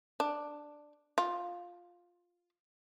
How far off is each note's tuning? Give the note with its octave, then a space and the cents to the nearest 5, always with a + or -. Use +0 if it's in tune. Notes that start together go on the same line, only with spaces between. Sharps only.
D4 +5
F4 +10